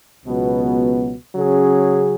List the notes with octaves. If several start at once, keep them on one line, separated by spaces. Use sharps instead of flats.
C#2 B2 F#3 B3
C#3 F#3 C#4 G#4